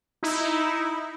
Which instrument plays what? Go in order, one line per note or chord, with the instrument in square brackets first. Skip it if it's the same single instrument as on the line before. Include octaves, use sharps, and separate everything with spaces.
[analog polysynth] D#4 E4